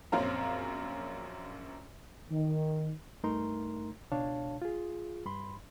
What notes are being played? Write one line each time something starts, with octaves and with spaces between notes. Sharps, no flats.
A#1 F#2 C4 C#5 F5 A#5
D#3
G2 A3 D#4 A#4 A#5 C6
C#2 B2 D4 C#5 F5 A5
F4 G#4
G2 B5 C6